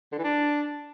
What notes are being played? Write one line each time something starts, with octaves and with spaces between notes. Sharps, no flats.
D3
E3
D4